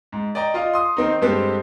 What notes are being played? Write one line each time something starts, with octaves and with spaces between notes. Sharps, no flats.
G#2
D5 D#5 G5 A#5
F4 D#5 F5
C6 D#6
D#3 C4 D#4
G2 G#3 C4 G4 A4 C5